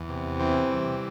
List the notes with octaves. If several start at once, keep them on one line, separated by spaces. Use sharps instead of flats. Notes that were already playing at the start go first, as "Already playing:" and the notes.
Already playing: E2
C3
E3 C4
G3